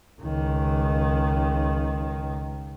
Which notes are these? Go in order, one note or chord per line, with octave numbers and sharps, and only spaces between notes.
C#2 D#3